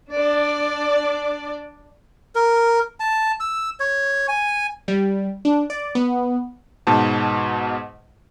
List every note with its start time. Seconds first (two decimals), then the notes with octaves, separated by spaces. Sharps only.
0.12 D4 D5
2.35 A#4
3.00 A5
3.40 E6
3.80 C#5
4.28 G#5
4.88 G3
5.45 D4
5.70 D5
5.95 B3
6.87 G#2 B2 A5